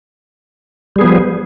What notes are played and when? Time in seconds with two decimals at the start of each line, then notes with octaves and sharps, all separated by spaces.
0.96 G3
0.99 G#4
1.01 B3
1.04 F3